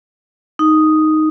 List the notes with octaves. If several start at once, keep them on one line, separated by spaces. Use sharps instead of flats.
D#4